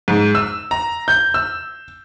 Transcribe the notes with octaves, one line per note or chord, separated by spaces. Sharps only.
G#2
E6
A#5
G6
E6